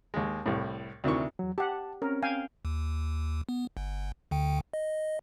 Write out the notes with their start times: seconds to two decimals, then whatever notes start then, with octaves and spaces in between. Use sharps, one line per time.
0.14 D#2 G#3
0.46 C2 A2
1.04 D2 C3 D#3 E4 C#6
1.39 E2 F#3
1.58 G4 F#5 A5
2.02 C4 C#4 A#4
2.22 F5 G5 G#5
2.65 D#2
3.49 B3
3.77 G1
4.31 D2 D3 G5
4.73 D#5